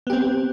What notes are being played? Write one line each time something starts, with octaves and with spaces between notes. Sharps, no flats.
B3 C4 G4